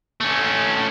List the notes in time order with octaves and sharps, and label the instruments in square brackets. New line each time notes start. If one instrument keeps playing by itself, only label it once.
[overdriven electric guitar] A3 C#4